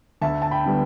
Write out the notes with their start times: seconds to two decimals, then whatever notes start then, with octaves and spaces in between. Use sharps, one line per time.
0.22 D2 E5 A5
0.42 A5
0.51 G5 B5
0.66 D3 G3 B3